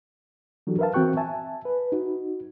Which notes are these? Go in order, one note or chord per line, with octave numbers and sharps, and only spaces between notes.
E3 F#3 D4 F#4 G4 A4
A#4 B4 E5 F5 A5
E3 C4 F#4 G5 C#6 F#6
E5 G#5 A5
B4
D#4 F#4